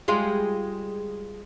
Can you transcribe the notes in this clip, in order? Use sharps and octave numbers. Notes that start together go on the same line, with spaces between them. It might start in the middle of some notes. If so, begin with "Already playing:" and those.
G3 G#3 F4